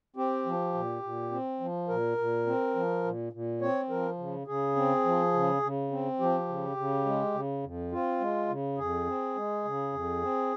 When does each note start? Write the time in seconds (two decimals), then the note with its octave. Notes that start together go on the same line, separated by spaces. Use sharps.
0.16 C4 G4
0.46 F3
0.74 A#2
1.03 A#2
1.32 C4
1.60 F3
1.88 A#2 A#4
2.18 A#2
2.46 C4
2.75 F3
3.04 A#2
3.33 A#2
3.61 C4 C#5
3.90 F3 A#4
4.19 C#3
4.47 C#3 G#4
4.76 C4
5.05 F3
5.34 C#3
5.62 C#3
5.91 C4
6.20 F3 G4
6.48 C#3
6.77 C#3
7.06 G#3
7.34 C#3
7.64 F2
7.92 C4 F4
8.20 G#3
8.49 C#3
8.78 F2 G#4
9.06 C4
9.36 G#3
9.65 C#3
9.93 F2
10.22 C4